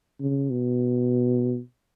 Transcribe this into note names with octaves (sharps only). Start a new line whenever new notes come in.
C#3
B2